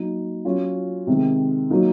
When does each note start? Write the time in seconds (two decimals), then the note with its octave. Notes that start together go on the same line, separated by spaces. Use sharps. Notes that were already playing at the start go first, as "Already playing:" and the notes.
Already playing: F#3 A#3 D#4
0.45 F#3 C#4 F4
1.07 C3 D#3 G#3
1.70 F#3 A#3 D#4